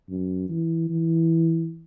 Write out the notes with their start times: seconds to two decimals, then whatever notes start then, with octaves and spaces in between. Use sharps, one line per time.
0.09 F#2
0.49 E3
0.89 E3